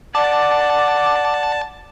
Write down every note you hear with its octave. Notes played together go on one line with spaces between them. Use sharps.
D5 F#5 A5 D6